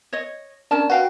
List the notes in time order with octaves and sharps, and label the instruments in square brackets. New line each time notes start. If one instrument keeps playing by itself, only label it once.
[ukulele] C#5 D#5
[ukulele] C#4 A#4 A5 [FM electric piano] D4
[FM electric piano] F#4 [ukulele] B4 F5 G5